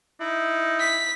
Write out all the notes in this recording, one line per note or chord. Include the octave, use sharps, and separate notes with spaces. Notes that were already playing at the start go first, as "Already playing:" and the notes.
D#4 E4
B6